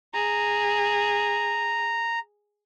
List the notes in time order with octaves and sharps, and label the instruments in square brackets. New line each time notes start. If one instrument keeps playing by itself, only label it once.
[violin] G#4 [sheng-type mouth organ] A#5